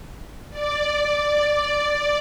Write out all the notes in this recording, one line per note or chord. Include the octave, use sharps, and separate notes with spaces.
D5